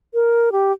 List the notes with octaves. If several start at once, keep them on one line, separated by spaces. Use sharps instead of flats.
A#4
G4